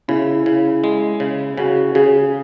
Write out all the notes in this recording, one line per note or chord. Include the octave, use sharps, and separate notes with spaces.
C#3 E4
C#3
G#3
C#3
C#3 F#4
C#3 G#4